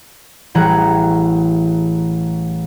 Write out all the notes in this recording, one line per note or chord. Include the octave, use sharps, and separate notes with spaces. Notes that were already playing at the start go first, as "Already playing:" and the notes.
A1 E3 G3 G#4 F#5 A#5